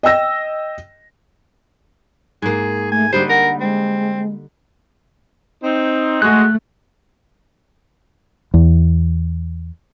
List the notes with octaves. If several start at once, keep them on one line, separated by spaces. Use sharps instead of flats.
D#5 G5 E6 A#6
G#2 A#3 G#4
A3 G#5
D3 G3 D#4 G4 C5
A#4 F#5
G#3 C4
C4 D#4
G#3 A3 F#4 F#6
E2